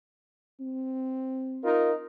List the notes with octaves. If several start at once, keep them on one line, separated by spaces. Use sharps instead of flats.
C4
D#4 F4 A#4